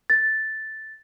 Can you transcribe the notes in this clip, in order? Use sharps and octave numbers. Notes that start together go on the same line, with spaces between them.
A6